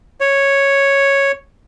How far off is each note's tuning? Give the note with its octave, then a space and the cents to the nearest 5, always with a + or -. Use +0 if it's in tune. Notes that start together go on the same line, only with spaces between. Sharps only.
C#5 -5